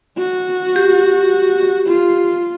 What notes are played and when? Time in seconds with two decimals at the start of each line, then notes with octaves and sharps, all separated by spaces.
0.17 F#4
0.76 G4
1.86 F4